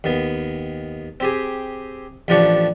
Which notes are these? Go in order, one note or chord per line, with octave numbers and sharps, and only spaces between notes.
D#2 B3
C4 G4 G#4
A1 F3 D4 G4 F#5 C#6